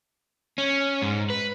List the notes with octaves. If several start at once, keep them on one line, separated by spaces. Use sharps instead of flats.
C#4
G#2
B4